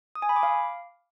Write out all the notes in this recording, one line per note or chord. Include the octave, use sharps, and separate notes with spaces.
D#6
G#5
B5
D6
F5